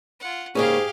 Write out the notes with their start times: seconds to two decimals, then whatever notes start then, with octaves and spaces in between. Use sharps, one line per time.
0.20 F4 F#5
0.55 G#2 C#3 A#3 C#4 G4 G#4 F5